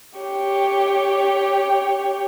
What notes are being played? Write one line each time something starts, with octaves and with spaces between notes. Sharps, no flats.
G4 C#5